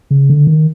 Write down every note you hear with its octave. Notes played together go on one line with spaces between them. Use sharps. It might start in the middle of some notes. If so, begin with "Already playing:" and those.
C#3
D3
D#3